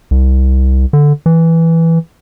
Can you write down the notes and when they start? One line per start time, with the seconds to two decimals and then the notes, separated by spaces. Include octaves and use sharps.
0.11 C2
0.93 D3
1.26 E3